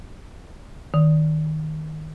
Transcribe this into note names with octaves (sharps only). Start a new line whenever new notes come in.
D#3